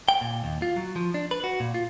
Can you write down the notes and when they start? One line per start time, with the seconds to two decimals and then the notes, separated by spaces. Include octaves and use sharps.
0.09 G5
0.21 A#2
0.44 D#2
0.62 F4
0.76 F#3
0.96 F3
1.14 D4
1.31 B4
1.44 F#4
1.60 A#2
1.74 F4